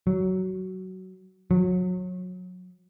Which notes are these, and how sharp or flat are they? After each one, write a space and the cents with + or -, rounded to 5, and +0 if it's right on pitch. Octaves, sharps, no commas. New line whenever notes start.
F#3 +15
F#3 -25